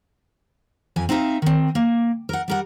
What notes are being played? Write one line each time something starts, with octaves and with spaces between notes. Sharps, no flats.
F2 F3 G#5
C4 D#4 E4 E5 F5
D#3 C4
A#3
A#4 F#5
G3 A#4 F#5